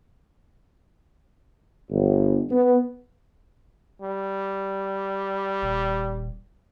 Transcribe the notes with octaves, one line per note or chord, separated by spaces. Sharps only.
G1
B3
G3
D#1